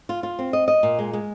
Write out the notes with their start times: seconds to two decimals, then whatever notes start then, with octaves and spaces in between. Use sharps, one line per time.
0.09 F4
0.23 F4
0.39 C4
0.53 D#5
0.68 D#5
0.83 A#2
0.99 G#3
1.13 G#3